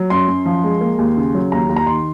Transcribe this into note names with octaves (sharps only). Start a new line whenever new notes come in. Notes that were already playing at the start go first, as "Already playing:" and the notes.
Already playing: F#3
F#2 C6
F#2
F3
G#3
A#3
D#2
C#3
F#3
D#2 A#5
D#2
A#5
D#3 C6